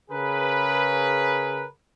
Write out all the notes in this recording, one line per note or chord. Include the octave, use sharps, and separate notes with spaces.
C#3 G#4 A#4 B4